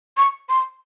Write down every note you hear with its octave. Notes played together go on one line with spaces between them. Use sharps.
C#6
C6